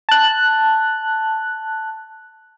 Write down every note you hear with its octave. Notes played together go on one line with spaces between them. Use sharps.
A5 F#6